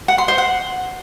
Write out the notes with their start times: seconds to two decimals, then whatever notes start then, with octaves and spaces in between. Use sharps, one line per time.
0.08 F#5
0.18 C6
0.28 C5
0.38 F#5